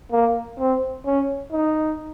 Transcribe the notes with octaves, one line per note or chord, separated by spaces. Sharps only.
A#3
C4
C#4
D#4